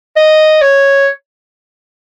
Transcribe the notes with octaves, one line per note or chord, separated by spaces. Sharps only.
D#5
C#5